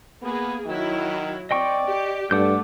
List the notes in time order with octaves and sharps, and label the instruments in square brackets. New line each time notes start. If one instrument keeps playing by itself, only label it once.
[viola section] A#3 G#4 [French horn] B3
[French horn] D#3 [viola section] F#3 E4
[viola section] C4 [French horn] D5 [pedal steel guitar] D#5 G5 C#6
[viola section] G4
[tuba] G2 [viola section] A3 [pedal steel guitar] F#5 D6 G6